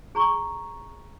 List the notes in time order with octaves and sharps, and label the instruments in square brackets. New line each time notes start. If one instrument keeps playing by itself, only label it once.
[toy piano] G#4 A#5 C#6